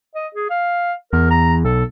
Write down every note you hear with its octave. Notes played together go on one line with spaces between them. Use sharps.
D#5
G#4
F5
E2 A#4
A#5
B1 A4